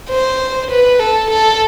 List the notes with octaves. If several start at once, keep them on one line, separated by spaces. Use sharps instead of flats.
C5
B4
A4
A4